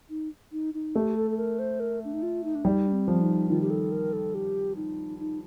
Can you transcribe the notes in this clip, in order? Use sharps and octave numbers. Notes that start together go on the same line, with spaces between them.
D#4
D#4
D#4
A3 G4
A4
A4
A#4
C5
A#4
D4
D#4
F4
D#4
D4
G3 D#4
D4
C4
F3
D#4
D#3 F4
G4
A4
A#4
A4
G4
D#4
D#4